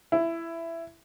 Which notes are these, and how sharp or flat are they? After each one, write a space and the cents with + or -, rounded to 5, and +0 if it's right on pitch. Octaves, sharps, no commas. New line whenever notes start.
E4 +15